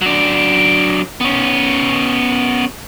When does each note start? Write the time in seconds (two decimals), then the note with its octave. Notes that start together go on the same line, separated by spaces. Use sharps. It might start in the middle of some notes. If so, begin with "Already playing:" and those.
0.02 F#3 D4
1.21 B3 C#4